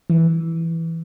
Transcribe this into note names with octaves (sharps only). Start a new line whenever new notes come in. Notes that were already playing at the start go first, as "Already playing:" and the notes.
E3